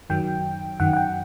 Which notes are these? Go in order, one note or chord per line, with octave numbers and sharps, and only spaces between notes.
F#2 D#3 F#3 G5
F#2 D#3 F#3 F#5
F#5
G5